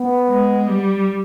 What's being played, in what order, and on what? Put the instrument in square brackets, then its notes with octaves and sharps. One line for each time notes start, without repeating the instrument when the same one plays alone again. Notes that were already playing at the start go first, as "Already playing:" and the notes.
Already playing: [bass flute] B3
[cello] G#3
G3